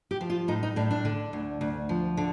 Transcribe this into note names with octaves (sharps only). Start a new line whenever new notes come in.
G4
F3
F4
A2 D#4
D#4
A2 D4
D4
D3
D2
D2
F3
D3